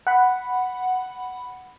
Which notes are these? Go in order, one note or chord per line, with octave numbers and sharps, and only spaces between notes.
F#5 B5